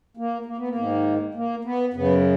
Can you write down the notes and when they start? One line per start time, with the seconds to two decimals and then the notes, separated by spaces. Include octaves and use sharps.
0.17 A#3
0.46 A#3
0.57 B3
0.68 A#3
0.75 G#2 D#3
1.35 A#3
1.65 B3
1.94 F#2 C#3 B3